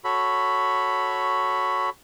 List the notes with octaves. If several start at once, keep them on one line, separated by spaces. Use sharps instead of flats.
F#4 A4 C#5 B5